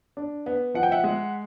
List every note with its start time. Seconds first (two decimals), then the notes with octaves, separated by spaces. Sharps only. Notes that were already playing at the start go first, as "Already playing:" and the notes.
0.17 D4
0.46 B3
0.74 F3 F#5
0.83 G5
0.91 E5 F#5
1.04 G#3